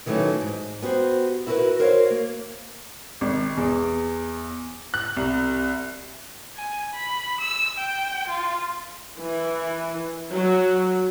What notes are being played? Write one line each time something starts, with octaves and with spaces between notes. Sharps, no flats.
D#3 E3 F#3 A3 C#4
G#2
B3 F#4 G4 C5
E4 F#4 G4 A#4 B4
F#4 A#4 C5 C#5 E5 F5
A#3
G#1
E2
F#6
C2
G#5
B5
E6
G5
F4
E3
F#3